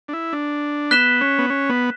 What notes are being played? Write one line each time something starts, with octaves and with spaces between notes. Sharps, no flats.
D4
E4
D4
B3 F#6 B6 E7 G7
C#4
B3
C#4
B3